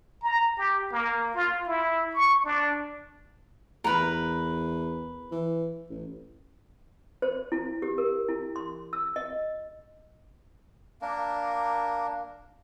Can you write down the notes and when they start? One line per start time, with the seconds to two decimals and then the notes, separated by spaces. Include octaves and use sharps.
0.22 A#5
0.58 G4
0.91 A#3
1.34 F4
1.67 E4
2.14 C#6
2.44 D4
3.84 E2 A#4 B4
5.31 E3
5.90 A1
7.22 C5
7.52 E4
7.82 G4
7.98 A#4
8.28 E4
8.56 C6
8.93 E6
9.16 D#5
11.02 A#3 D4 A#4